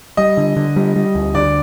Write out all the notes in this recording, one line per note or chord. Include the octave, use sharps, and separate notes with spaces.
G3 D#5
D3
D3
G3
G3
D2
D3 D5